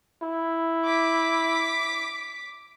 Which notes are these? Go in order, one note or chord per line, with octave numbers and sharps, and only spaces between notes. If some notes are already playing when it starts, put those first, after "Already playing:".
E4
D6 B6